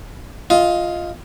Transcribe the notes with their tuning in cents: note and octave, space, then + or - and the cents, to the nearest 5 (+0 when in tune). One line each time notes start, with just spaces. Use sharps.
F4 +0 D#5 +15